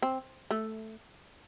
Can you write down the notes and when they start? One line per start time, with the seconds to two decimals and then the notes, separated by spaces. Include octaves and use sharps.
0.02 C4
0.51 A3